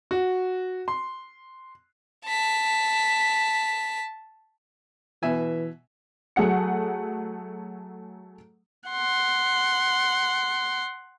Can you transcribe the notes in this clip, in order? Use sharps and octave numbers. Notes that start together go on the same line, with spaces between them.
F#4
C6
A5 B6
B2 E3 E5 G#5
F#3 A3 G#4 F#5 C#7
F#5 C6